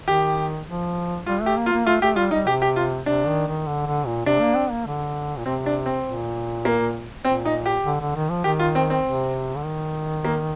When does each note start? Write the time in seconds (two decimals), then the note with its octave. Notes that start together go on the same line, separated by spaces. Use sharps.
0.07 D#3 G4
0.67 F3
1.26 G3 F4
1.42 A3 G4
1.57 A#3
1.66 F4
1.72 A#3
1.87 A3 F4
2.02 A3 G4
2.16 G3 F4
2.31 G3 D#4
2.47 C3 G4
2.62 G4
2.76 F4
3.06 C3 D4
3.26 D#3
3.47 D#3
3.66 D3
3.86 D3
4.06 A#2
4.25 C3 D4
4.40 A#3
4.56 C4
4.71 A#3
4.86 D3
5.38 A#2
5.46 C3 C4
5.66 D4
5.86 C4
6.05 A#2
6.65 A#3
7.25 A#2 C4
7.45 D#4
7.66 G4
7.85 D3
8.01 D3
8.15 D#3
8.29 F3
8.44 D#3 G4
8.59 F4
8.75 C4
8.90 C4
9.05 C3
9.56 D3
9.65 D#3
10.25 A#3